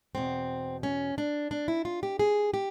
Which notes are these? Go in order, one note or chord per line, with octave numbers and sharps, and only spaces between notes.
E2 B2 C4
C#4
D4
D4
E4
F4
G4
G#4
G4